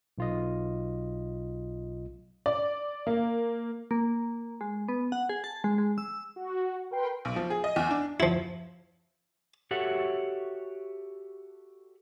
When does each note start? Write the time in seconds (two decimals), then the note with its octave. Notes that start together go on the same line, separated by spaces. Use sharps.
0.18 B1 F4 D#5
2.46 D5
3.07 A#3
3.91 A#3
4.61 G#3
4.88 B3
5.12 F#5
5.29 G#4
5.44 A5
5.64 G#3
5.78 G#3
5.98 E6
6.36 F#4
6.91 A#4 B4 G5 C6
7.25 B1
7.36 F3
7.50 G#4
7.64 D#5
7.76 E2
7.91 D4
8.20 F3 E4
9.71 F#4 G4 A4 C#5 E5 F#5